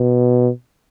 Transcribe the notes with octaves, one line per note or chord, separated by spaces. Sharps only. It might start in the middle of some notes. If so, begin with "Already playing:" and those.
Already playing: B2